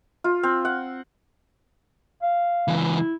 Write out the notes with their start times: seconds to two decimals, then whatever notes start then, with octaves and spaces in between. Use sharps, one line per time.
0.24 F4
0.43 C4
0.65 F#5
2.22 F5
2.68 C#2 E3
2.97 E4